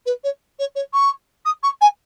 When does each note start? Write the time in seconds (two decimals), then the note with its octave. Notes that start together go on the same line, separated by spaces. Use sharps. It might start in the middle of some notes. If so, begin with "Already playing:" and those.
0.06 B4
0.24 C#5
0.59 C#5
0.75 C#5
0.93 C#6
1.45 D#6
1.63 C#6
1.81 G#5